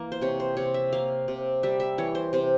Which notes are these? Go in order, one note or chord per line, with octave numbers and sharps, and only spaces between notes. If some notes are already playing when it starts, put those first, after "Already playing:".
Already playing: E3 A#3
C5
C3 C#5
C5
C3 C#5
E5
A#3 F5
C3
G3 E5
E5
E3 C#5
C5
C3 C5